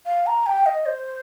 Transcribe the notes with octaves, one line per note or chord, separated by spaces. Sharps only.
F5
A#5
G5
D#5
C5